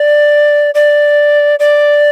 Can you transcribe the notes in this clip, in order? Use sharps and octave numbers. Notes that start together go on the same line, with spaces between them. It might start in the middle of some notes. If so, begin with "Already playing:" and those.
Already playing: D5
D5
D5